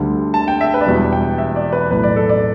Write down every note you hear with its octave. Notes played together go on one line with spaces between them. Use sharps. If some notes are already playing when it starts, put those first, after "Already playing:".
Already playing: D2 D3 G3
A5
G5
E5
B4
D5
E1 E2 B2 G3 B4
G5
E5
D5
B4
B1 A2 A3 B4
D5
A4
D5